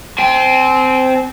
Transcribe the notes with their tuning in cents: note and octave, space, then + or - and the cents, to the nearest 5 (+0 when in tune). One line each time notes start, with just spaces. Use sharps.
C4 -10 G#5 +45